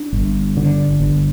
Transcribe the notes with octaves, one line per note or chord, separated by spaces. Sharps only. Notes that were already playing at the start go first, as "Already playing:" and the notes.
Already playing: D4
G1
D3
G1